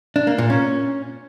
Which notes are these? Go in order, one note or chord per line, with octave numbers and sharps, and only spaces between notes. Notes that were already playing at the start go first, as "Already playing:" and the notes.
D4
A#3
A#2
C#4